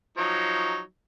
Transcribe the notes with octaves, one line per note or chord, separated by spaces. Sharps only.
F3 F#3 D#4